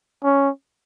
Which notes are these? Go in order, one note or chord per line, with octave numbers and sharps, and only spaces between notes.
C#4